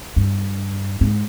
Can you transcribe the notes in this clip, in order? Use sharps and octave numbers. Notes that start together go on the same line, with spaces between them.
G2
G#2